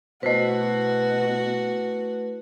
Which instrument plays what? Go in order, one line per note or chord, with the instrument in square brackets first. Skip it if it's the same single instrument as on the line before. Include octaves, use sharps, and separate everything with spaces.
[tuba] B2 [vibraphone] A3 E4 B4 [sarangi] F#4 [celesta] C5 D#5